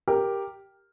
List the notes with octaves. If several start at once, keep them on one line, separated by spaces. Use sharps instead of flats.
G4 A#4